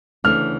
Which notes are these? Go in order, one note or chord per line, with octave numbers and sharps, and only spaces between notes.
D2 C#3 E3 A3 D4 F6